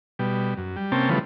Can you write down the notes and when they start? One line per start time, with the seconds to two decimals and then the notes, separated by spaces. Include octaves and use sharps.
0.19 B2 G3
0.57 F#2
0.77 G3
0.92 C3 A#3 C4 C#4 G5 A5
1.10 C#3 E3 F3 G3 A3 B3